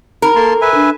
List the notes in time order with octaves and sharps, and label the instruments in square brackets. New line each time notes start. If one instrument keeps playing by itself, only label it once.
[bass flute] D#4 [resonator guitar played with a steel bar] A#4
[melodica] A#3 A5 C6 [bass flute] A4
[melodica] B4 E5 G#5
[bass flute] D4